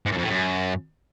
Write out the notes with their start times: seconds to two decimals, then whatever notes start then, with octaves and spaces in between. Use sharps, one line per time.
0.06 G#2
0.12 F#2
0.18 F2
0.24 A2
0.30 F#2